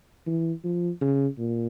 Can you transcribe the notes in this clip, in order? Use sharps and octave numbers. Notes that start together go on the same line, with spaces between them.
E3
F3
C#3
A#2